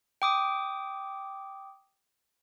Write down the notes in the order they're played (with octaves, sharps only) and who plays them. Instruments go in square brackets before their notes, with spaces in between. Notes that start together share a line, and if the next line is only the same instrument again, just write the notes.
[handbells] G5 D6 D#6